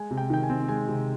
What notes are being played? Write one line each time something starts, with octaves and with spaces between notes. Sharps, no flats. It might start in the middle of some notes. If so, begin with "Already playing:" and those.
Already playing: G#3 G#5
C3
G5
D#3 G5
G#5
C4
G#3 G#5
C3